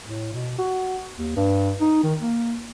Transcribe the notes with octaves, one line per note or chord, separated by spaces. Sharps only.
A2
B2
F#4
D#2
G2
D#4
D#3
A#3